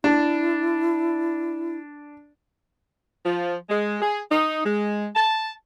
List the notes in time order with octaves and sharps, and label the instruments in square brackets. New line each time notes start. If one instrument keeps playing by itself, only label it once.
[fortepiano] D4 [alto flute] E4
[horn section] F3
G#3
G#4
D#4
G#3
A5